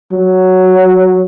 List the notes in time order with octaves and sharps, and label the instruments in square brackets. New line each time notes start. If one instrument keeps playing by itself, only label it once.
[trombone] F#3